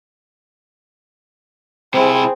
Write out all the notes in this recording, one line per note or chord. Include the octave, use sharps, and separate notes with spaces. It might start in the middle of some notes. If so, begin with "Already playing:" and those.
C3 C4 E4 G#4